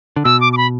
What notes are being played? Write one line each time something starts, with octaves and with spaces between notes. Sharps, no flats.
D3
B2 E6
D6
D6
B5